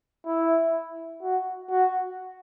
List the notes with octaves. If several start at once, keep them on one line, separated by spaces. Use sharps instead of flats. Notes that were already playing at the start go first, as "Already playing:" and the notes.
E4
F#4
F#4